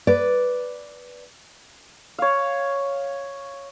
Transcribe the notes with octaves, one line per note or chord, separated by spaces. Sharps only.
B4 D5
C#5 F5